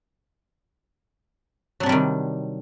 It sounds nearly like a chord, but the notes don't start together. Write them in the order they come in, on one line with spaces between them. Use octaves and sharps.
F#3 D4 C3 G3 D#3